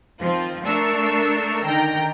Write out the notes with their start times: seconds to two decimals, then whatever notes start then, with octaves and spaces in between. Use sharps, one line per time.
0.20 D#3 F3 C4 F4
0.64 A3 D4 A#4 C#6 E6 C7
1.64 D3 D#3 G5 A#5